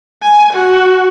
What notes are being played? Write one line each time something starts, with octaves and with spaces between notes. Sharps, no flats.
G#5
F#4